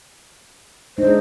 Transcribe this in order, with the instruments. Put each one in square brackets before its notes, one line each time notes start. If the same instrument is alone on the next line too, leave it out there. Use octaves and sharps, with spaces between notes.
[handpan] G#3 D4 D#4 [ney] C5